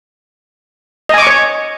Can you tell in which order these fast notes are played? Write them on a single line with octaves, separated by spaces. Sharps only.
D#5 G#5 D6 C#6 C#5